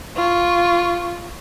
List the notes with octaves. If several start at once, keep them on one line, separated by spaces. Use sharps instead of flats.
F4 C#6